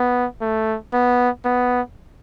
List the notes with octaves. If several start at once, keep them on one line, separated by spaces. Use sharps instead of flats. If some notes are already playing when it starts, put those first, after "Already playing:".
Already playing: B3
A3
B3
B3